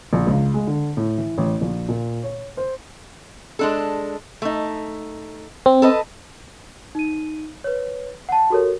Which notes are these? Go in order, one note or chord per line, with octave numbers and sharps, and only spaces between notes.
A#1
C#2
G#3
D3
A2
E3
A1
A#1
A#2
C#5
C5
G#3 D4 A4
A3 D#4
C4
A4 B4 D#5
D#4 D#7
B4 C#5
F#5 A5
F#4 G4 A4 A#4 C#5